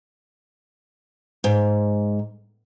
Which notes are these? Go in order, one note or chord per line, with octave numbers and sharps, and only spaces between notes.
G#2